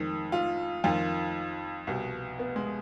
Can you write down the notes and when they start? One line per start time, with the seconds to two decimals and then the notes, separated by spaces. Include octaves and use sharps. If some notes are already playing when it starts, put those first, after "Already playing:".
Already playing: F2 D#3 G#3
0.32 F4
0.84 F2 D#3 F4
1.87 C2 B2
2.39 B3
2.56 G#3